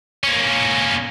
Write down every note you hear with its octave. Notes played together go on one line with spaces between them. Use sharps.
A#3 C#4